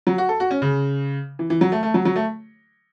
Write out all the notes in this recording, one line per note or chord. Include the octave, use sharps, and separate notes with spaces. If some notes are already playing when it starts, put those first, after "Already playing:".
F#3
F#4
A4
F#4
C#4
C#3
E3
E3
F#3
A3
A3
F#3
F#3
A3